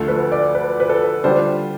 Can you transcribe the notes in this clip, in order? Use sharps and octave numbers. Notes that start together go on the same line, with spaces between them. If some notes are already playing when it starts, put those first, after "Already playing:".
Already playing: D2 D3 F3 A3 A4
B4
D5
B4
B4
A4
D3 G3 D4 F4 C5